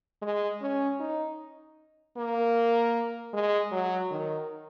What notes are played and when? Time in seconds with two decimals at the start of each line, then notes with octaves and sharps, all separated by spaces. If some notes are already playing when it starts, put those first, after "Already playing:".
0.22 G#3
0.61 C#4
1.00 D#4
2.17 A#3
3.33 G#3
3.71 F#3
4.11 D#3